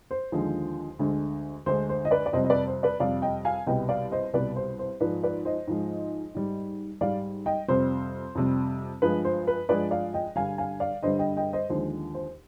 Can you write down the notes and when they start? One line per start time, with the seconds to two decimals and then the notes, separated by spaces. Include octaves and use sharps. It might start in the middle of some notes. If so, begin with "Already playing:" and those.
0.11 C5
0.32 D#2 D3 F3 G#3
0.99 D2 D3 G#3
1.66 D2 D3 G#3 C5
1.89 C5
2.05 D#5
2.11 B4 D5
2.26 D5
2.33 F2 C3 G3 C5 D#5
2.44 D#5
2.50 B4 D5
2.67 C5
2.83 B4 D5
3.00 F2 C3 G3 D5 F5
3.22 D#5 G5
3.45 F5 G#5
3.67 C2 B2 G3 D#5 G5
3.89 D5 F5
4.12 C5 D#5
4.33 C2 B2 G3 B4 D5
4.56 C5
4.79 C5
5.00 G#2 F3 G#3 B4 D5
5.23 B4 D5
5.45 C5 D#5
5.67 G#2 F3 G#3
6.35 G#2 G3
7.01 G#2 G3 D5 F5
7.46 D#5 G5
7.68 F2 C3 G3 C5
8.35 F2 C3 G3
9.02 G2 F3 G#3 B4
9.25 C5
9.47 B4
9.69 G2 F3 G#3 B4 D5
9.91 D5 F5
10.14 D#5 G5
10.36 G2 D3 G3 F5 G#5
10.58 F5 G#5
10.80 D5 F5
11.03 G2 D3 G3 C5 D#5
11.19 D#5 G5
11.37 D#5 G5
11.53 C5 D#5
11.70 D#2 D3 F3 G#3 C5
12.15 C5